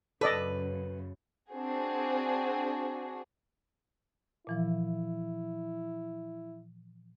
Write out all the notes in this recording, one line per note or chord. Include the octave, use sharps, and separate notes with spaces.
F#2 C#3 A4 B4 D5 D#5
C4 D4 F#4 G#4
A#2 E3 F3 E4